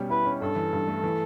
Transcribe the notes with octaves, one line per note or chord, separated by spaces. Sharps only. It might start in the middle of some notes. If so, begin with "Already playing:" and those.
Already playing: B2 G3 C#4
E4 B4
C#4
G2 A4
E3
G2
A3
E3